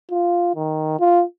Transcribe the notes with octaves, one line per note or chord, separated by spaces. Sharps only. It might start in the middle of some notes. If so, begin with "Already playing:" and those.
F4
D#3
F4